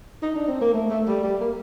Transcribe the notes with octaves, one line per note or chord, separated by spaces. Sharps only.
D#4
D4
C4
A#3
A3
A3
G3
G3
A#3